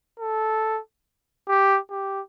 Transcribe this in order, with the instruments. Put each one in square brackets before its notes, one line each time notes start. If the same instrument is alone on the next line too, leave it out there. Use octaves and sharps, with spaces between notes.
[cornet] A4
G4
G4